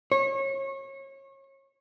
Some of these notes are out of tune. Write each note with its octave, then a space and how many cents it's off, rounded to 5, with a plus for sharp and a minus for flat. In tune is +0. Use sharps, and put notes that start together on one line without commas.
C#5 -30